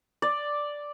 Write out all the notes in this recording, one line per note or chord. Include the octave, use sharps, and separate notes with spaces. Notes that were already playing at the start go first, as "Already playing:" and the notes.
D5